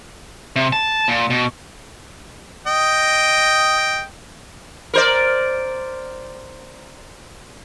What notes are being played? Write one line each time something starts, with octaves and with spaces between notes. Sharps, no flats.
C3
A5
A#2
B2
D#5 G5
A#4 C5 D5